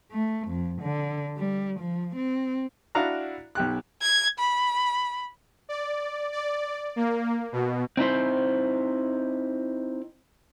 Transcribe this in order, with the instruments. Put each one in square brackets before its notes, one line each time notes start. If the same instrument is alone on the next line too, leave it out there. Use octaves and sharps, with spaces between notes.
[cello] A3
F2
D3
G3
F3
C4
[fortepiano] D4 E4 F#4 F5 A#5
B1 G4 F#6
[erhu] G#6
B5
[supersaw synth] D5
D5
A#3
B2
[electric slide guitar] C4 D#4 E4 C5